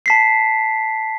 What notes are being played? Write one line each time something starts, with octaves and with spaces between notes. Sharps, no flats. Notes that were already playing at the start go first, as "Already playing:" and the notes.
A5 B6 C7